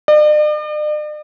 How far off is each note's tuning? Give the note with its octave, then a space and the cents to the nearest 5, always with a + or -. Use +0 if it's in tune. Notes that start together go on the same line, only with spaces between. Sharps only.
D5 +45